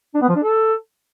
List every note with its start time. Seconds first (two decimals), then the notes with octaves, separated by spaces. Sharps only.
0.14 D4
0.22 B3
0.29 F3
0.36 D4
0.43 A4